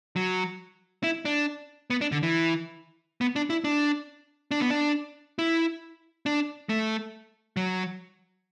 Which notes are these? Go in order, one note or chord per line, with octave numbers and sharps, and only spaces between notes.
F#3
E4
D4
B3
D4
D3
E3
B3
D4
E4
D4
D4
B3
D4
E4
D4
A3
F#3